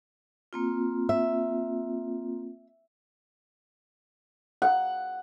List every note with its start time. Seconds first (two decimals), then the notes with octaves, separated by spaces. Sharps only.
0.53 A#3 C4 F4
1.09 E5
4.62 F#5